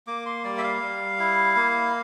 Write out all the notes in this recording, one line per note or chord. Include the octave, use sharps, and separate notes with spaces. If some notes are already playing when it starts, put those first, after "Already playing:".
A#3 D6
C6
G3 D5
E5
F5
G3
E4
A#3